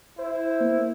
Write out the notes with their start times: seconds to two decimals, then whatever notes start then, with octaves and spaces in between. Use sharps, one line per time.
0.19 E4 C5
0.61 A#3